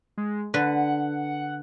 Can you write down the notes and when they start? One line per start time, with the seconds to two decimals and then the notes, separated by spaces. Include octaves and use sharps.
0.17 G#3
0.54 D3 B4 F#5